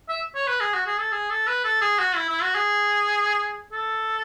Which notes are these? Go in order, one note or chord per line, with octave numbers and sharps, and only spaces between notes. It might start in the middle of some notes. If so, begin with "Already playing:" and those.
E5
C#5
B4
G#4
F#4
G#4
A4
G#4
A4
B4
A4
G#4
F#4
E4
E4
F#4
G#4
A4